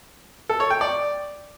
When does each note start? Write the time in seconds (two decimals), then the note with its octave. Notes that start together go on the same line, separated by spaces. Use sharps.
0.49 A4
0.60 C#5
0.70 G5
0.81 D5